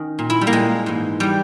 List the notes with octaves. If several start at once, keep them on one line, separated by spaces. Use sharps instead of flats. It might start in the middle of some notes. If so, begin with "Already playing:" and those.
Already playing: D#3 C#4 D#4
A#2
E4
G3
A#3
A#2 G#3
G#2 E3
E3 G3